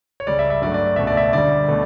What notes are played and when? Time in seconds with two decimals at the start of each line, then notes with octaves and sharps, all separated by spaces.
0.20 C#5
0.27 C#2 C#3 G3 D5
0.39 E5
0.50 E5
0.62 G2 F#3 A3 D5
0.74 D5
0.96 C#2 B2 A3 E5
1.07 D5
1.17 E5
1.32 D2 D3 G3 D5
1.68 B2 A3